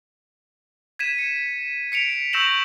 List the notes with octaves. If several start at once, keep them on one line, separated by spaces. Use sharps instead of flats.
G#6 B6 D#7 E7
C#7
B6 C#7 D7 F7
C#6 E6 G6 A#6 E7 F#7